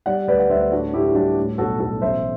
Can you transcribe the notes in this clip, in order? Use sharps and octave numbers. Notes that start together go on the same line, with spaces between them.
G3 D5 F#5
D2 B4 D5
F#5
D2 C5 E5
A2 D4 F#4
A2 E4 G4
E4
G3 D4 F#4
A2
B1 F#4 A4
B1 F#4 A4
A1 C5 E5